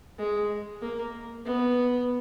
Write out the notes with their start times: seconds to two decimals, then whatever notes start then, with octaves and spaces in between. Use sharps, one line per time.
0.18 G#3
0.81 A#3
1.45 B3